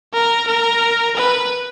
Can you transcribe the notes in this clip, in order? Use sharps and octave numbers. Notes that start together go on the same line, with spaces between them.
A#4
A#4
B4